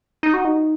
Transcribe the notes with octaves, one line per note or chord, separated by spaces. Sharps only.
D#4
F#4
D#4